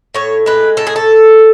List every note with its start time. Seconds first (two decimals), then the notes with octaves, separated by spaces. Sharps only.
0.14 A2 C#5
0.46 G#3 B4
0.77 A2 A4
0.87 G#4
0.96 A4